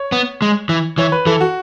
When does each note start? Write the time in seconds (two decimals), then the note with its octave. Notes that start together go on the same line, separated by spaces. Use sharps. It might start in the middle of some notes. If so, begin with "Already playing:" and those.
Already playing: C#5
0.12 B3
0.42 G#3
0.69 E3
0.98 E3 C#5
1.12 B4
1.26 E3 A4
1.40 F#4